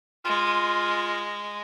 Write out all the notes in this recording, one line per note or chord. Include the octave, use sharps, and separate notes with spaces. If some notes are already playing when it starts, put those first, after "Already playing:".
G#3 F4